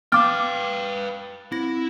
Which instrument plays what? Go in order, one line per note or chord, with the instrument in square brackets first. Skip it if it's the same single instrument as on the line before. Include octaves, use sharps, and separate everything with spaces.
[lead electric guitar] B4 G5 [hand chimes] F5 A6 [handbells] D6 F6
[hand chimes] C4 A#6 [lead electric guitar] E4